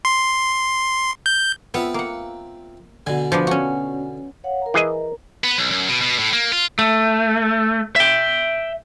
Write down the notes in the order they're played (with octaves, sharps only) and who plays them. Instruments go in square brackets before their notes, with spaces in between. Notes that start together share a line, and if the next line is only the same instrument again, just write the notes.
[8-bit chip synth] C6
G6
[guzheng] B3 [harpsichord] C4 F4 E5
[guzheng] A#3 F#5
[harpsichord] B2 D3 [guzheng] G#5
[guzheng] F3 B3 D4
C#4 F#4
[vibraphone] C#5 F5 F#5
A#4 A#5
[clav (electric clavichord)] E3 G#4 D#5
[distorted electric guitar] B3
B1
F#2
B2
B2
A2
A#3
F4
[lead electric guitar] A3
E5 G5